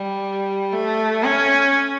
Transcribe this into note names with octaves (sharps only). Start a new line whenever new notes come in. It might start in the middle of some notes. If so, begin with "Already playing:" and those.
Already playing: G3
A3
C#4